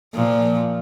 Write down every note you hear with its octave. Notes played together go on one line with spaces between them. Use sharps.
A#2 F3